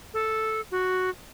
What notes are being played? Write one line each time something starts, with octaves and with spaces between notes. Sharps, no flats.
A4
F#4